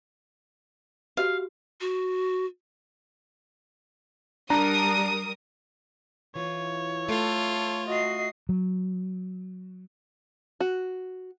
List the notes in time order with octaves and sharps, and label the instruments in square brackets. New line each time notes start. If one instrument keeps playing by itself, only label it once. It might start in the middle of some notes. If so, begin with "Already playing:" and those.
[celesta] F#4 G4 [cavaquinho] F5
[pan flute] F#4
[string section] G3 A#4 D#6 [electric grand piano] D4 A#5
[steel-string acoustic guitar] E3 F4 [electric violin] C#5
[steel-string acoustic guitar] A3 [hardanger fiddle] F4 [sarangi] A4
[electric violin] F#4 C7 [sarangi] D#5
[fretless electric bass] F#3
[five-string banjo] F#4